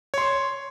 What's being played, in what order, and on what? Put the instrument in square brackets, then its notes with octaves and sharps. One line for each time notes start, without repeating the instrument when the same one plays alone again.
[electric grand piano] C#5
C6
C#6